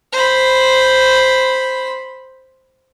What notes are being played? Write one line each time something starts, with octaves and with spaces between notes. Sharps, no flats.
C5 B5